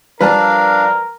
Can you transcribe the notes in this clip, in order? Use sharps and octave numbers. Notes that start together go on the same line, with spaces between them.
F3 G3 D4 A#4 B4 F5 A5 A#5